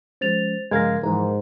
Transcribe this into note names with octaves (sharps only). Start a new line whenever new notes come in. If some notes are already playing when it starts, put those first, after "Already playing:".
F3 G#3 C#4 C5 A6 F7
G2 C#3 F3 G#3 A#4 F5 G#6 A#6
G#2 E3 F3 A#4 A#5